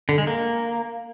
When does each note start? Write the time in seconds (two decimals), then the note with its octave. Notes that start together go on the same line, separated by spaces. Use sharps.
0.09 D3
0.18 G#3
0.27 A#3